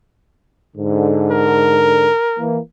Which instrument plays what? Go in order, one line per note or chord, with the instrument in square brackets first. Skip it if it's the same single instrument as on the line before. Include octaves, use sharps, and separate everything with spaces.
[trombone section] G#2 D3
[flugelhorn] A#4
[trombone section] E3 A#3